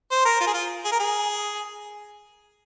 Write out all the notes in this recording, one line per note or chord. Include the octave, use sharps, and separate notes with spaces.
C5
A#4
F4
G#4
F4
G#4
A#4
G#4